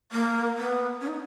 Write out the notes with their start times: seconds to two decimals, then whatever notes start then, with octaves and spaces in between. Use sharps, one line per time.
0.12 A#3
0.57 B3
1.01 C#4
1.08 D#4